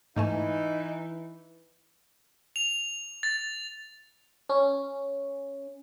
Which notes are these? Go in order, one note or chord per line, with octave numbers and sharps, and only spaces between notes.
G#2 E3 A3 D#4 E4 G#5
F7
A6
C#4